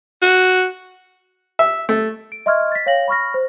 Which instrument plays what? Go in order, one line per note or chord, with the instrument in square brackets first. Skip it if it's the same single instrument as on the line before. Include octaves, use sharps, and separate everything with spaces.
[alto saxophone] F#4
[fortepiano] E5
A3
[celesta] D7
D#5 E5 C6 C#6 F6 G#6
A6 B6
C#5 F5 G5 A#6 F#7
B5 C#6 F6 A#6
C5